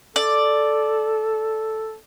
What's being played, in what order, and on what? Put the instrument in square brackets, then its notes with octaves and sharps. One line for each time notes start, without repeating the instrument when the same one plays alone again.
[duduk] A4 [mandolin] D5